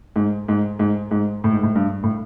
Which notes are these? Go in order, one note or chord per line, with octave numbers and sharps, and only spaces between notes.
G#2
G#2
G#2
G#2
A2
G#2
A2
G2
A2